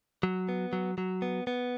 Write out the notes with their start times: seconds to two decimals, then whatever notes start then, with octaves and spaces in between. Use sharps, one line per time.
0.23 F#3
0.49 B3
0.73 F#3
0.98 F#3
1.22 B3
1.47 B3